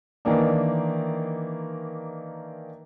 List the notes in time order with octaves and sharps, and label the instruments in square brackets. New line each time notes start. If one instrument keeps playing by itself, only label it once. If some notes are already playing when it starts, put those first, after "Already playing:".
[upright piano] D#3 E3 A#3 D4